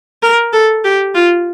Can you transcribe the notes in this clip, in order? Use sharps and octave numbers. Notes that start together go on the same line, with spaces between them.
A#4
A4
G4
F4